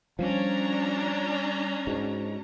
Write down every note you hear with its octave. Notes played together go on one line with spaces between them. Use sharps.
F3 G3 C#4 D4 A#5
G#2 F#4